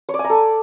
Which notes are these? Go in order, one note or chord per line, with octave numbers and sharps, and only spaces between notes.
C#5
D5
G#5
A#5
A4